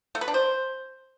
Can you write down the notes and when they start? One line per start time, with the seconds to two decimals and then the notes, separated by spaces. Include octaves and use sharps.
0.15 A3
0.21 B4
0.28 D4
0.34 C5